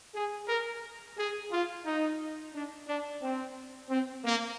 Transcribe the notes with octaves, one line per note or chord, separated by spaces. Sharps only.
G#4
A#4
G#4
F4
D#4
D4
D4
C4
C4
A#3